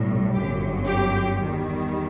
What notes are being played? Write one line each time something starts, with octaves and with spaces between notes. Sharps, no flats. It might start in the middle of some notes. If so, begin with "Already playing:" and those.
Already playing: B1 A2 G3
G1 F#2 F#3 G4
G4
E2 D#3 G3